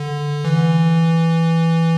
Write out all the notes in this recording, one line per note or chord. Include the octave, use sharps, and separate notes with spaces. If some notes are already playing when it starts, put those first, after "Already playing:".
Already playing: D3
E3